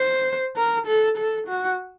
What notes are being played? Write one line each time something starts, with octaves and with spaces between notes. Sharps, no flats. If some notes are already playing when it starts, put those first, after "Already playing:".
Already playing: C5
A#4
A4
A4
F#4